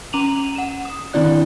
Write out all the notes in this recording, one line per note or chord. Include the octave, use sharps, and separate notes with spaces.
C#4 A#5 D6 D#7 F7 F#7
F#5 E7
D#6
D#3 C4 D4 E4 D5 F#6